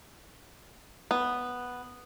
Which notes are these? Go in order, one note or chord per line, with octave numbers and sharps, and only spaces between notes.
B3